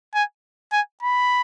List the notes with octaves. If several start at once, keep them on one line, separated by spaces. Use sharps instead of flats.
G#5
G#5
B5